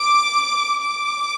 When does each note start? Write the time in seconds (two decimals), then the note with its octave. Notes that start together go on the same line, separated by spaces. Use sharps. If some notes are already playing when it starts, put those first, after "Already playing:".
Already playing: D6
0.81 D6